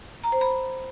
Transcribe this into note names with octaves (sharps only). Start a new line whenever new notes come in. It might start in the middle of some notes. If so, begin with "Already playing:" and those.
A#5
C5
B5